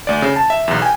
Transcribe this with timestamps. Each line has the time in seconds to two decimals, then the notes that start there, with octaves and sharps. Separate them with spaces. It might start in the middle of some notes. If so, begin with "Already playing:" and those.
0.07 D2 D5
0.22 C#3
0.36 A5
0.50 E5
0.68 B1 E2
0.82 G5 G#5